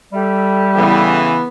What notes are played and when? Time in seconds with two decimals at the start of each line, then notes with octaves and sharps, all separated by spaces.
0.13 G3 G4 A4 E5
0.76 C#3 E3 B3